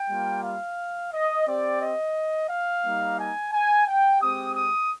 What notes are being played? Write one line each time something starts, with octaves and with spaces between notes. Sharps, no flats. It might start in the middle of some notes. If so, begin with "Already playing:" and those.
Already playing: G5
G3 A#3 F4
F5
D#5
C4 G4 D5
D#5
F5
G3 A#3 D#4
G#5
G#5
G5
G#3 C4 G4 D#6
D#6